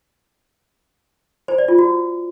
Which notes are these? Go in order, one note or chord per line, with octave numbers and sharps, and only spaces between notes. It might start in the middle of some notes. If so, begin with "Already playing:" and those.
C5
D5
F4
F#4